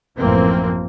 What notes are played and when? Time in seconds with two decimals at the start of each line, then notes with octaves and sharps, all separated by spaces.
0.18 A1 F#2 E3 F3 A#3 C4